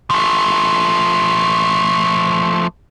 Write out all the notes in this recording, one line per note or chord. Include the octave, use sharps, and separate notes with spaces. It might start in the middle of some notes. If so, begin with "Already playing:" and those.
F3 A3